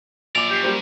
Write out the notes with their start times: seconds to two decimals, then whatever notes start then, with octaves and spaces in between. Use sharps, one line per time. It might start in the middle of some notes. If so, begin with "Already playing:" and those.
0.35 A#1 F#3 D5 D6 F7
0.50 F#2 G4
0.63 G3 A#3 C5